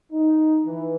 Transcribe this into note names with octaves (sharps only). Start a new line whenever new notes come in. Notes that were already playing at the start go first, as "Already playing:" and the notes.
D#4
E3